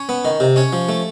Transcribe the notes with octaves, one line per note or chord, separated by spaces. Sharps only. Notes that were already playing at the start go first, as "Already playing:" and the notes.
Already playing: C#4 C#5
B3
D#3
C3
C#4 C#5
F3
A3